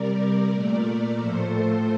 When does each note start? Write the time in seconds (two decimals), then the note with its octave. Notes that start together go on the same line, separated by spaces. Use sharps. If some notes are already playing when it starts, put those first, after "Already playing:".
Already playing: C3 G3 A#4 D5
0.52 A#2 A3
1.18 A2 F3 A3 A4 C5